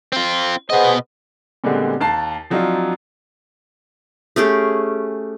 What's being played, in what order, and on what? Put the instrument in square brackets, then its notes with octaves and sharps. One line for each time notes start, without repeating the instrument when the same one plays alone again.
[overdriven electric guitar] C4 F4
[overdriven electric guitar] B2 D#5 [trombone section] B3 G#4 C5
[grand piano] A#2 D3 G3 G#3 B3 C4
D#2 A5 A6 C7
F3 F#3 C4 D4 D#4 F4
[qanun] A3 C#4 G4 G#4